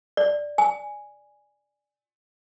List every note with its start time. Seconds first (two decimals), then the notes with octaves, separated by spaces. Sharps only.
0.17 D5
0.58 G#5